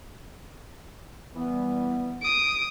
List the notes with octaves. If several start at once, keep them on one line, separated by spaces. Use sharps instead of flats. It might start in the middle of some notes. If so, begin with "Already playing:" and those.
E3 G3 B3
D#6 D7